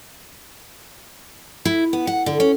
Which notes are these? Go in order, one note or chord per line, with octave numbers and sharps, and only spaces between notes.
E4
B3
F#5
D3
C#4